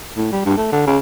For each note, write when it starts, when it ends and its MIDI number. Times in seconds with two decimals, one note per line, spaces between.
0.17 0.30 45
0.32 0.43 55
0.45 0.57 43
0.57 0.68 57
0.72 0.85 50
0.87 0.98 49